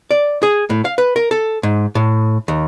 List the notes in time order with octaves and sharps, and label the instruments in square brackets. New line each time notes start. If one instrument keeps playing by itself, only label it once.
[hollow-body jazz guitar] D5
G#4
A2
F5
B4
A#4
A4
G#2
A2
D#2